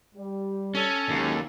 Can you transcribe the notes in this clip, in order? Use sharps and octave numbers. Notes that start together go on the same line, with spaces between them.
G3
C#4 A4
D#2 F#3 G#3